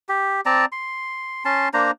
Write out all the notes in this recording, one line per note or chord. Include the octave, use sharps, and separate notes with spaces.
G4
C4 D5 A5 A#5
C6
C#4 A5 C6
A#3 D4 C5 A#5